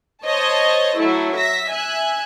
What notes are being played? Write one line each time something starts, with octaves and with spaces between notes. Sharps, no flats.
C5 C#5 D#5 A5
F#3 A3 E4
E5 A#6 B6
E5 G#5 F#6